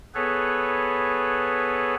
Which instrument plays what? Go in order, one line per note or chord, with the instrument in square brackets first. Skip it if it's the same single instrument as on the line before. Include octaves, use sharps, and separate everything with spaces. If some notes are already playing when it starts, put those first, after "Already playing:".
[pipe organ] B3 G#4 A4 B4 C#5